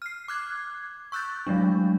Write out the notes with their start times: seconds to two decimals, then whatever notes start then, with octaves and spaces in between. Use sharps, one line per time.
0.02 F6 C7
0.28 D6 F#6 G#6
1.12 C#6 E6 F#6 G6 A6
1.47 F#3 G#3 A3 D4